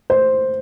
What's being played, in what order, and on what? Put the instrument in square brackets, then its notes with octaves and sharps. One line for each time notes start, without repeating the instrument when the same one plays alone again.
[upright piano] C5